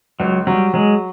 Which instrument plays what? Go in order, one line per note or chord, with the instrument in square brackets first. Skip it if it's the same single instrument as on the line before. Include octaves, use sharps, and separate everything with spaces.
[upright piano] C#2 [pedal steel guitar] F#3
[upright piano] F#3 [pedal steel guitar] G3
[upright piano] F#3 [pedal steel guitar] G#3